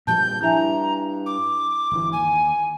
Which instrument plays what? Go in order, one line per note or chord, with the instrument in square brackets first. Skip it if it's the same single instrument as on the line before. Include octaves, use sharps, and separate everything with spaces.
[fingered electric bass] A#2 F3 G3 [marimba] A5 [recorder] G6
[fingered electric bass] G2 [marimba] E4 E5 G#5 [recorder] A#5
[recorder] D6
[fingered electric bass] G1 E3
[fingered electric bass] D#2 [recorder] G#5